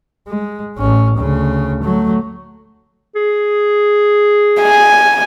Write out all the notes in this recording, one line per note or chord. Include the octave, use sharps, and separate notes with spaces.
G#3
A1 C#4
D2 C#3
F#3 A3
G#4
G#5